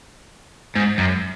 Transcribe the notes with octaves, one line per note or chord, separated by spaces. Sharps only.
G#2
F#2